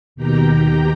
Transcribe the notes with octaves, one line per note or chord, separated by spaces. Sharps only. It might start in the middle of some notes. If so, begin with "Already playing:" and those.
D#2 B2 D#3 G4 G5 A#5